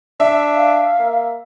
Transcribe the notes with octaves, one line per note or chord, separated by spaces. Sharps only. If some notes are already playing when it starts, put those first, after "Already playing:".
D4 E5
F5
A#3